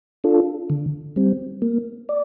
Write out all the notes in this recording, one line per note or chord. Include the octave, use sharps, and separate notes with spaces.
D4 F4 A4
D3
G3 C4
A#3
D5